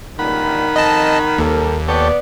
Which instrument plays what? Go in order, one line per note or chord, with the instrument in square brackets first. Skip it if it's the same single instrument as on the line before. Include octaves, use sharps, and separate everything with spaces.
[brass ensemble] C#2 G2 A#2 [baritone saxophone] D#3 [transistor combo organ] F#5 B5
[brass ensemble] F2 [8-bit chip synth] D#5 A5
[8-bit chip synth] D#2 [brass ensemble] G3 A4 A#4
[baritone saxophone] B3 [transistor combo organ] A4 C#5 G5 [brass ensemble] D5